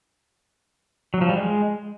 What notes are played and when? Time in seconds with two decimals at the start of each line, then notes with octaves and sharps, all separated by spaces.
1.14 F#3
1.21 F3
1.29 G3
1.37 G#3